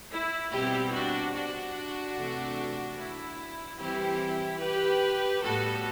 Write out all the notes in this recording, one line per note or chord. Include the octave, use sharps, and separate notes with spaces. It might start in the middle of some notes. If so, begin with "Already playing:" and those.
E4
B2 G3 C4 E4 G4
D4 F#4
D4 F#4
C3 E3 A3
E4
E3 G3 C4 E4 G4
G4 B4
A2 G3 B3 F#4 A4